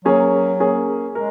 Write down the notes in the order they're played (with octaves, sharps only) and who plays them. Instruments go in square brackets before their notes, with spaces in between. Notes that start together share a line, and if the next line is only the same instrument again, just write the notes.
[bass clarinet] F#3 [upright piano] A#3 C#4 G#4
[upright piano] A#3 C#4 G#4
[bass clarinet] G#3 [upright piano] A#4